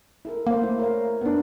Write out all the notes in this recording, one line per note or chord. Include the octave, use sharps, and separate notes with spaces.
E4 A4 A#4
A#3 A4 C5
A3 E4
A#4 C#5 F5
B3 D4